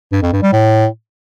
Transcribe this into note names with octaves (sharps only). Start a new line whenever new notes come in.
G2
F2
G2
G3
A2